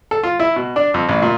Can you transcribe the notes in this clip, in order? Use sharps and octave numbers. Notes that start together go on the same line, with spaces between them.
A4
F4
E4
B2
D4
F2
A1
A#2